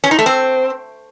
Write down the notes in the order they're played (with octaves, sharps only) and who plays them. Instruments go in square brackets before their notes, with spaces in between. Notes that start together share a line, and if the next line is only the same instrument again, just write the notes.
[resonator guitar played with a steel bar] C#4
D#4
A3
C4